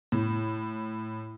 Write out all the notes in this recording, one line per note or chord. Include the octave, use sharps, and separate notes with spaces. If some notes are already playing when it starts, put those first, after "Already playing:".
A2